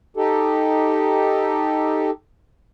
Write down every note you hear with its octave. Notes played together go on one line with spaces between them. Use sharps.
D#4 G4 A4